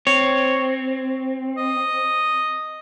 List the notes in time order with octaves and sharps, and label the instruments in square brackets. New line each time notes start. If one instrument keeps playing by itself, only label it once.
[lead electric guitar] C4 [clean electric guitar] C#5
[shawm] D#5